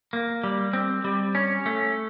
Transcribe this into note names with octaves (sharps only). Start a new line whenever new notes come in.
A#3
G3
C4
G3
C#4
A3